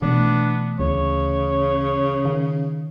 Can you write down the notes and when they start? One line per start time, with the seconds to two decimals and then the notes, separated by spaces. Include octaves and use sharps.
0.02 B2 E3 A3 B3 D4
0.80 D2 C#3 C#5
2.25 D#3